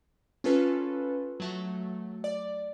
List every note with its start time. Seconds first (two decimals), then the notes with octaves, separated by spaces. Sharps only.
0.44 C#4 F4 A4 B4
1.40 F#3 A3
2.24 D5